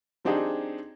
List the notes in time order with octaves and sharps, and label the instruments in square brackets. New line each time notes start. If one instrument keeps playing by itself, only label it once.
[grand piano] F#3 C4 D4 D#4 G4 G#4